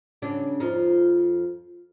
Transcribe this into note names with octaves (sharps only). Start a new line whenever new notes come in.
C#3 F#3 D4
F2 F3 D#4